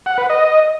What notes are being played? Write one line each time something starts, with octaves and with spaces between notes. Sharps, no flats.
F#5
B4
D#5